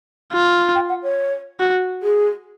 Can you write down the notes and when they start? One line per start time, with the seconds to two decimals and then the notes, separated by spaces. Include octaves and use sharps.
0.33 F4
0.75 G5
0.89 F#5
1.03 C#5
1.60 F#4
2.02 G#4